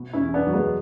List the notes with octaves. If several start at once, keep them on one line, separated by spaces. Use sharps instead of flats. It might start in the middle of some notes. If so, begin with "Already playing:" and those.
Already playing: B2
C#4 E4
E2
B3 D4
F#3
G#3 B3